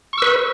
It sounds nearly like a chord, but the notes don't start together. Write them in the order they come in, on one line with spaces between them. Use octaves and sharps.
C#6 E6 B4